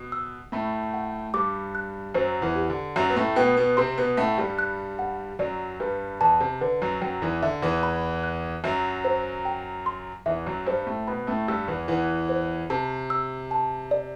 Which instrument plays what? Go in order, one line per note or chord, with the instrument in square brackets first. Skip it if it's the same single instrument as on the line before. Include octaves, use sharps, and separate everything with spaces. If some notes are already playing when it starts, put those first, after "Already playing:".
Already playing: [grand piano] B2
[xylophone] E6
[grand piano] A2 A3 [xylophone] B5
[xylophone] F#5
[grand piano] G2 G3 [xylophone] D6
[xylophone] F#6
[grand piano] F#2 F#3 [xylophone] C5
[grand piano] E2 E3
[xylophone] G4
[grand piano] D3
[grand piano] F#2 F#3 [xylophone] E5
[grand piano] B3
A2 A3
[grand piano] B2 B3 [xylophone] G5
[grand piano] B2 B3
[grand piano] C3 C4 [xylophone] C6
[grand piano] B2 B3
[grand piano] A2 A3 [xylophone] F#5
[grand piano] G2 G3
[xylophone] F#6
F#5
[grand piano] F#2 F#3 [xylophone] D5
[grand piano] G2 G3 [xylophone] B4
[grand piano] E2 E3 [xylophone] A5
[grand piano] C3
[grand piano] D3 [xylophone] B4
[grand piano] F#2 F#3
[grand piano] F#2 F#3 [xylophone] G5
[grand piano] E2 E3
[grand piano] D3 [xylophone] E5
[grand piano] E2 E3
[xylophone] B5
F#6
[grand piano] F#2 F#3 [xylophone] E5
[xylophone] C5
G5
C6
[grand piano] E2 E3 [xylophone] E5
[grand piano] F#2 F#3
[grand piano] G2 G3 [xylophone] C5
[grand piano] A2 A3
[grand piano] B2 B3 [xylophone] B5
[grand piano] A2 A3
[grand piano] G2 G3 [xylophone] E6
[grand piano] E2 E3
[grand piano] E2 E3 [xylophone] F#5
[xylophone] C5
[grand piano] C3 [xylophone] A5
[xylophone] E6
A5
D5